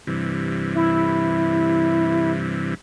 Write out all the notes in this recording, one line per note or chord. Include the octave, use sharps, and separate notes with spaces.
G2 C3 E3
E4